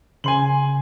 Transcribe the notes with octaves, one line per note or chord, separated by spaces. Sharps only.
C#3 G#5 C6 F#7